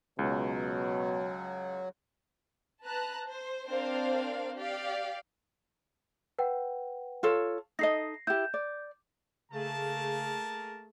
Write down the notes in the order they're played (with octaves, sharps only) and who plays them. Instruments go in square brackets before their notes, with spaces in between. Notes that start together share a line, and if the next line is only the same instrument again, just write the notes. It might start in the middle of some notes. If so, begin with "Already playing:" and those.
[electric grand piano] C#2 [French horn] B2 [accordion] F#3
[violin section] B4 A5 A#5 F#6
C5
C4 D4 A#4 C5 D5 F5
G4 D5 F5
[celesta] B4 F#5 G5
[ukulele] F4 A4 C#5
[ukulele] D#4 A4 D#5 [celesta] A#6 C7
[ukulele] E4 G4 [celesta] G6
[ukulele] D5
[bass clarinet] C#3 [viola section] A3 G#4 [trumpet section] A#3 A#4 A5